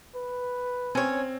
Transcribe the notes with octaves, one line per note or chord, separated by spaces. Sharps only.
B4
C4 C#4 C#5